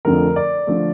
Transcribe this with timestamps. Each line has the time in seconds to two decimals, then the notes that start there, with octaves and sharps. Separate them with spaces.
0.05 F2 D3 F3 A3 A#4
0.36 D5
0.67 D3 F3 A3